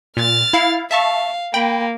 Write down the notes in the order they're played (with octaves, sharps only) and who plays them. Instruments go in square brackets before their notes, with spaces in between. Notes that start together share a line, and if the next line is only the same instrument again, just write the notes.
[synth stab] A#2 [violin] F6 A6
[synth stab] E4 F5
[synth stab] E5 A5 C#6 [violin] F5
[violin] A#3 [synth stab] G5 B5